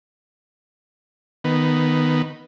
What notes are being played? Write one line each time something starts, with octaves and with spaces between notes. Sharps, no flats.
D#3 B3